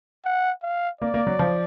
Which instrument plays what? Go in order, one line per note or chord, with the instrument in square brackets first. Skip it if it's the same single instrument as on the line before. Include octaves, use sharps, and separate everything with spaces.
[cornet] F#5
F5
[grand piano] A#3 [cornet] D5
[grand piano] A#3
F#3
F3